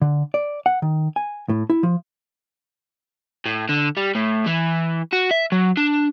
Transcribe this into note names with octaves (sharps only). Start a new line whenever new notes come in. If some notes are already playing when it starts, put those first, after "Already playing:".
D3
D5
F#5
D#3
G#5
A2
E4
F3
A2
D3
G3
A2
E3
F#4
E5
F#3
D4